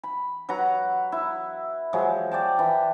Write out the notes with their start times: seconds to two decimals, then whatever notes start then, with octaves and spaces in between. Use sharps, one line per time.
0.03 B5
0.49 F#3 B4 F#5 A#5
1.12 E4
1.93 F3 F#3 G#3
2.31 D5 G5 A5
2.59 E3